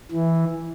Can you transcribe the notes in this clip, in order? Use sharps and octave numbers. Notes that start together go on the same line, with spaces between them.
E3